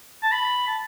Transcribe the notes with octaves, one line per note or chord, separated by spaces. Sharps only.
A5
B5
A5